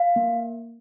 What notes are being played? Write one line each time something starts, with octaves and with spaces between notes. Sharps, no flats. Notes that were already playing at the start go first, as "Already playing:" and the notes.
Already playing: F5
A#3